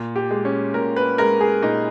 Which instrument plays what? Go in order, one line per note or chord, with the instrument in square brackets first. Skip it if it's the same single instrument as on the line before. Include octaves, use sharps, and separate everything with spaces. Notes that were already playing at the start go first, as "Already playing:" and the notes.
Already playing: [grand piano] A#2
G4
G#3
C#4
A#2 A#4
B4
G#3 A#4
G#4
A#2 D#4